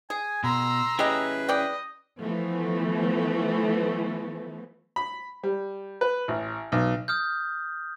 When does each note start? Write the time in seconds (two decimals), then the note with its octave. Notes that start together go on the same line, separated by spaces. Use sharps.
0.10 G#4 G#5
0.44 B2 A#5 C6 E6
0.99 C#4 E4 G4 G#4 B4 D#5
1.49 D5 D#5 G5
2.20 E3 F3 A3 B3
4.96 B5
5.43 G3
6.01 B4
6.28 A1
6.72 B1
7.08 D#6 F6 G6